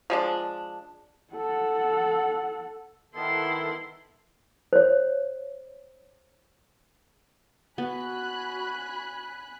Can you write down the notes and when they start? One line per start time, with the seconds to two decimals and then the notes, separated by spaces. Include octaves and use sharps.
0.10 F3 G#3 D4
1.34 A4 F#5
3.15 D#3 B3 E4 A4 C6
4.73 C5 C#5
7.78 B3 F#4 G#5 B5 F#6